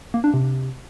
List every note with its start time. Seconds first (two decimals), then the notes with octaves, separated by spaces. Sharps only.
0.14 A#3
0.24 D4
0.34 C3